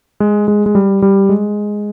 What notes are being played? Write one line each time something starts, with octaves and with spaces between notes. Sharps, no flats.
G#3
G#3
G#3
G3
G3
G#3